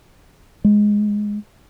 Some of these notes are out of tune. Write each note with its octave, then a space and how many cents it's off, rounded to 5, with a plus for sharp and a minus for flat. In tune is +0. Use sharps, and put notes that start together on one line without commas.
G#3 +0